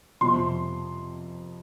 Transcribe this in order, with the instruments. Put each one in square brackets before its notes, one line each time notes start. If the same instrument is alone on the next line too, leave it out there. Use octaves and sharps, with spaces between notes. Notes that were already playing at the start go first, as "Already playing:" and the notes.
[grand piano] F2 C3 F3 C6